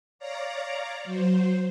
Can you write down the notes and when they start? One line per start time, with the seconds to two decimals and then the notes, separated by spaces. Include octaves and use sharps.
0.19 C#5 D5 F5 A#5
1.04 F#3 C5